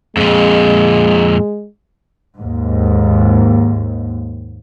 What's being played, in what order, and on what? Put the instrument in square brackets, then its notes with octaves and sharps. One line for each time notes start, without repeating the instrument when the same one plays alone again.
[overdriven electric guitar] F2 A#2 [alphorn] G#3
[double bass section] D#2 G#2